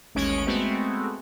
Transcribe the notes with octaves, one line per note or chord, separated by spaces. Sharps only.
A1 D#2 G#3 C#4 C#5 D7
G#3 A3 B3 C4 F#4